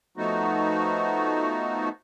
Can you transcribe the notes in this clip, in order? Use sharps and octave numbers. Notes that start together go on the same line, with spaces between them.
F3 A3 B3 D#4 F#4